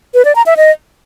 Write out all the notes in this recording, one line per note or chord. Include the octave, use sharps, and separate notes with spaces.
B4
D5
A#5
E5
D#5